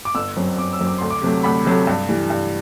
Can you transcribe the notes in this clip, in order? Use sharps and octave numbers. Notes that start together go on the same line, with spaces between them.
D6
G1 E6
F#2 F#3 C4
G1 D6
E6
F#2 F#3 C4
D6
D2 C6
D6
C3 F#3 A3
D2 B5
C3 F#3 A3
G2
E3 G3
G2